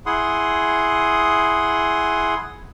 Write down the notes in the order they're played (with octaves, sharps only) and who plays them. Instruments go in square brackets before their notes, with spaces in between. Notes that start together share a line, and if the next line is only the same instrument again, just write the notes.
[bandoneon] E4 G#4 F#5 C6 D#6